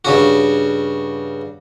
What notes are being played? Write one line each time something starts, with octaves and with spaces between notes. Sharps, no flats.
G2 C#3 F#4